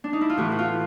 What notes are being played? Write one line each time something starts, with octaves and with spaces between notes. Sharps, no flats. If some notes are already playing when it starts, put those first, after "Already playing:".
D4
D#4
E4
F4
A2 E3 F#4
F#4
F4